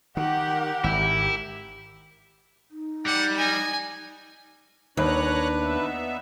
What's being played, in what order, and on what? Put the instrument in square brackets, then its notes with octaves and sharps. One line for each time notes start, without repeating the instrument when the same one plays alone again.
[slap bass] D#3 [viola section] G4 A#4 [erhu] F#5
[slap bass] G#1 [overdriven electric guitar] E4
[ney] D#4
[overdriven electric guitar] G3 [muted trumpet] F#5
[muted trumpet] D#5 [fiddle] G#5
[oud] D#2 [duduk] D4 [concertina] B4 [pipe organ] C#5 A#5 F#6
[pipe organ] B3 D#4 E5